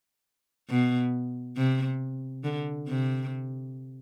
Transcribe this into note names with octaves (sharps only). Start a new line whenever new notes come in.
B2
C3
D3
C3